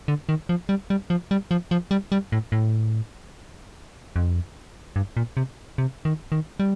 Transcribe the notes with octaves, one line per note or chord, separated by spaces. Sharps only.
D3
D#3
F3
G3
G3
F3
G3
F3
F3
G3
G3
A2
A2
F2
G2
A#2
C3
C3
D#3
D#3
G3